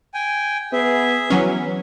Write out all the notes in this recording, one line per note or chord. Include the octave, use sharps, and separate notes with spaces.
G5 G#5
B3 G#4 E5
E3 F#3 B3 C#4